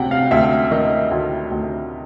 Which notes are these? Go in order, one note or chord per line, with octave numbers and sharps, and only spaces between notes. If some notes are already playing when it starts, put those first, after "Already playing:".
Already playing: D2 C3 F#5 G5
F5
D2 E5
D#3 D#5
D2
D2